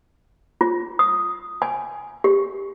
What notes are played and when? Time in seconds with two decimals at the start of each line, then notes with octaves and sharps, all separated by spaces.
0.61 F4
0.99 D#6
1.62 G#5
2.24 G4